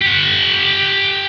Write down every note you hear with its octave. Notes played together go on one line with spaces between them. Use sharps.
G4 F#5